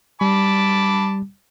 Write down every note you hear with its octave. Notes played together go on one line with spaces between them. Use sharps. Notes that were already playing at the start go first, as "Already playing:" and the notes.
G3 A5 B5 D6